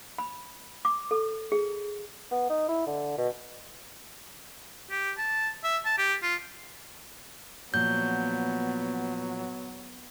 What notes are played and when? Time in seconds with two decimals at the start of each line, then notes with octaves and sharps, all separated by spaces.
0.18 B5
0.85 D6
1.11 A4
1.52 G#4
2.31 B3
2.50 D#4
2.69 E4
2.86 D3
3.18 B2
4.90 G4
5.18 A5
5.64 E5
5.85 A5
5.98 G4
6.22 F4
7.74 A#2 F3 F#3 B3 G6